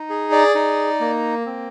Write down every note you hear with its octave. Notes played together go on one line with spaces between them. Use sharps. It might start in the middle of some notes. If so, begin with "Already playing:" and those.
Already playing: D#4
G#4
D5
D#4
A#3
C4